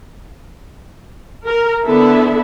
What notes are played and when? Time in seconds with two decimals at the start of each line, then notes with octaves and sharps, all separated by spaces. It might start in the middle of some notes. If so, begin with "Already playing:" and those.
1.46 A#4
1.86 D3 B3 E4 A4 E5